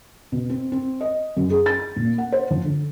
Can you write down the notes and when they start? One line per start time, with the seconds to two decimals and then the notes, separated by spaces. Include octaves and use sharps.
0.32 B2
0.50 C4
0.72 C4
1.01 D#5
1.37 F#2
1.50 G#4
1.66 A6
1.96 A#2
2.18 F#5
2.32 C5
2.51 F3
2.64 D3